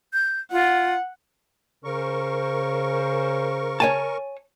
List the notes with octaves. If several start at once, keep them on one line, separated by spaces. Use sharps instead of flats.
G6
F4 F#5
C#3 C#4 A#4 C5 C#6
C#5 G#5 A5